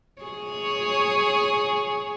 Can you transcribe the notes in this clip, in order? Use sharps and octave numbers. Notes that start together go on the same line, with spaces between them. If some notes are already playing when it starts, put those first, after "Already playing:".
G#4 C#5